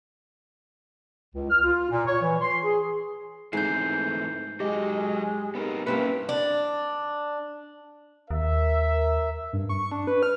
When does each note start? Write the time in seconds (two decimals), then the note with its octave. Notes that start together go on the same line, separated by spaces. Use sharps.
1.35 C#2
1.50 F6
1.64 F4
1.90 A#2
2.07 C#5
2.22 E3
2.41 C6
2.64 G#4
3.53 G#2 E3 A3 C4 G6 C7
4.60 F#3 G#3 G4 D#5
5.55 B3 C4 D#4 A#4
5.87 G2 A#3 C4 C#4 E4 B4
6.29 D4
8.31 D#2 A#4 E5
9.53 G2
9.69 C#6
9.92 D4
10.07 B4
10.23 F6